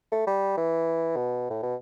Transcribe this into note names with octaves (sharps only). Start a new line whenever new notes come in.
A3
G3
E3
B2
A2
B2